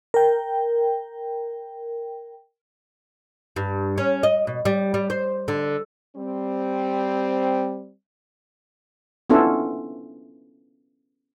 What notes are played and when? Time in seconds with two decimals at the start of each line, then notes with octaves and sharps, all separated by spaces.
0.14 A#4 G5
3.56 G2
3.98 C#4
4.23 D#5
4.47 B2
4.65 G3
4.94 G3
5.10 C5
5.48 D3
6.17 G3 C4
9.30 B3 C#4 D4 E4 F4 A4